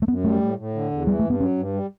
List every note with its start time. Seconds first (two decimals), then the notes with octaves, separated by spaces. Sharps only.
0.02 A3
0.08 F#2 B3
0.24 G3 A3
0.42 A2
0.58 A2
0.75 D3
0.91 E2
1.07 E3 G3
1.19 A3
1.25 G2
1.30 B3
1.40 F#3 C#4
1.58 G2
1.73 G3